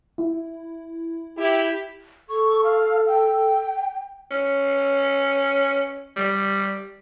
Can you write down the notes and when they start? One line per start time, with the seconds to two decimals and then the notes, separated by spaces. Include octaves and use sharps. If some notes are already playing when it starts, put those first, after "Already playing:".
0.18 E4
1.38 E4 G4
2.29 A4 C#6
2.64 F5
3.08 G5
4.31 C#4
6.16 G3